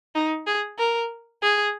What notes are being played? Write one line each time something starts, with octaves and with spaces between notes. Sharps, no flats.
D#4
G#4
A#4
G#4